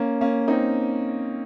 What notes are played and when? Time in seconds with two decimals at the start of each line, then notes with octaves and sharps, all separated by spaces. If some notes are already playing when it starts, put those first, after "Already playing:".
Already playing: A#3 C#4
0.21 A#3 C#4
0.48 C4 D#4